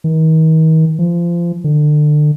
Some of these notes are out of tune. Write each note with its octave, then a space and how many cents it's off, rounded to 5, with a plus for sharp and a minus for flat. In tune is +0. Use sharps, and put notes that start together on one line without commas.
D#3 +40
F3 -25
D3 +30